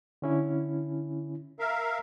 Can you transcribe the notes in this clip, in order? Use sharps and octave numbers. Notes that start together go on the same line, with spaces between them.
D3 C#4 E4
A#4 E5 F5